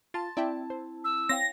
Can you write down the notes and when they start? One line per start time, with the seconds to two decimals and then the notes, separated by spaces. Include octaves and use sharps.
0.14 F4 A5 C6 A6
0.37 C4 E4 D5 E5 G5 A5
0.70 C5
1.04 E6
1.29 C4 C#5 F5 G5 A#6